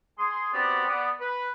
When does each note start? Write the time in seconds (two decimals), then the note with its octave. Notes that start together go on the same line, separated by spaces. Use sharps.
0.19 G#4 C6
0.54 B3 C4 F#4 G4 B4 D5
0.87 B3 D5
1.20 B4